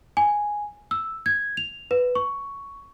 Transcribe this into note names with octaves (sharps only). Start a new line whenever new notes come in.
G#5
E6
G#6
F7
B4
C#6